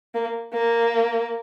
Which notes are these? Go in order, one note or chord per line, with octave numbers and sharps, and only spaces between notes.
A#3
A#3